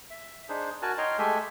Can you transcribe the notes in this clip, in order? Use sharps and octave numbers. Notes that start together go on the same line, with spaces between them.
E5
D4 D#4 G#4 C5
F#4 A#4 G#5 A5 F#6
D#4 C#5 D#5 G5 C6 F6
G#3 A3 G4 A4 E5 G#5